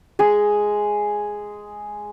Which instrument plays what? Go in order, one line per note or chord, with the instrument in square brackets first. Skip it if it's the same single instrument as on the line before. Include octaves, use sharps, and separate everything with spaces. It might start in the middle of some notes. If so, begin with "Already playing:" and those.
[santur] G#3 G#4